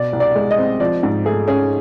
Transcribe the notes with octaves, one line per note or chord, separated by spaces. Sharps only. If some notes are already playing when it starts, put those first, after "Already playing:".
Already playing: B2 D5
C2
D5
G#3
D#5
C4
F3 D5
G#2
A3 G#4
C#4 G#4